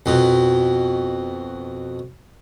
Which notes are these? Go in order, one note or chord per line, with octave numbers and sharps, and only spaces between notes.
F2 B2